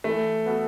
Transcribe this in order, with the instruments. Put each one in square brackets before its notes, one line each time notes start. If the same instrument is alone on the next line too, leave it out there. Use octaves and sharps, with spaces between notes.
[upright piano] E3 [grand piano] A3
[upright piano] B3 F#4 A4